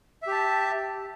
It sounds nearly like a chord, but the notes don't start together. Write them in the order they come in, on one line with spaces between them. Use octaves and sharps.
E5 G4 A5